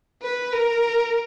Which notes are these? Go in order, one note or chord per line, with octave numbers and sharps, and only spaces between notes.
B4
A#4